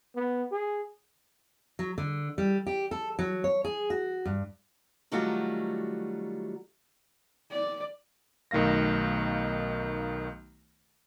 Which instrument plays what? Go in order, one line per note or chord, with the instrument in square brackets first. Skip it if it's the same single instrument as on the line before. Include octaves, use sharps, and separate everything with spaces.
[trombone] B3
G#4
[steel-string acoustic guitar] F#3
D3
G3
G4
A4
F#3
C#5
G#4
F#4
G2
D#3 F#3 G3 A3 F4 F#4
[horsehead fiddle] D5
[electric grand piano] B1 D#3 A3 F5 A#6